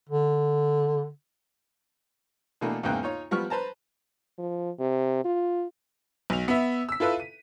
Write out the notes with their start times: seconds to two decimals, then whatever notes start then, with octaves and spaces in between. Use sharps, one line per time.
0.09 D3
2.61 B2 E3 A3 A#3 D4
2.83 E2 G#2 C#3 A#3 G5 F#6
3.03 D#4 F4 C#5
3.31 F3 G3 B3 C#6 F6
3.50 B4 C5 A5 A#5
4.38 F3
4.80 C3
5.25 F4
6.30 B1 F7
6.48 B3 E5
6.89 E6 B6
7.00 E4 F4 A4 B4 E5
7.20 D#7